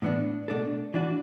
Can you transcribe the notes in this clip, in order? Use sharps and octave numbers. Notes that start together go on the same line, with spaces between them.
A2 E3 B3 D4
B2 A3 D4 A4
E3 D4 F#4 D5